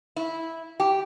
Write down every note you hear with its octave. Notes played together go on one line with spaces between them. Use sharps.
E4
G4